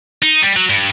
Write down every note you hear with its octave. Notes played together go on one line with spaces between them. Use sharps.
D#4
G3
F#3
G2